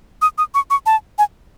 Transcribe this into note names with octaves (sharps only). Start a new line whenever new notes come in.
D#6
D#6
C#6
C#6
A5
G#5